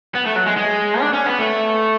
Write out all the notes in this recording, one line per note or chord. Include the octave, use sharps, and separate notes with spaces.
B3
A3
F#3
G#3
G#3
D4
C#4
B3
A3